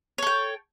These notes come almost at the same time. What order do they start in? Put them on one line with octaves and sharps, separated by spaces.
C#5 A4 G5